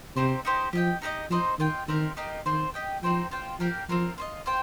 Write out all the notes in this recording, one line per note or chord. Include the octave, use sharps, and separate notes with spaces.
C3 C4 D#4 G4 C5
D#4 G4 C5
F3 G4 D#5 G5
D#4 G4 C5 D#5
F3 C4 D#4 C5 D#5
D#3 F4 D#5 G5
D#3 C4 D#4 G4 A#4
A#3 D#4 G4 D#5
D#3 C4 F4 C5
G4 D#5 G5
F3 C4 D#4 C5 G5
F4 C5 G5
F3 A#3 G4 A#4 G5
F3 C4 F4 A#4
F4 C5 D#5
F4 C5 G5